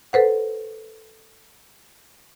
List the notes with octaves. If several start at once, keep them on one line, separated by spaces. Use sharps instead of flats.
A4 B4 C5 F#5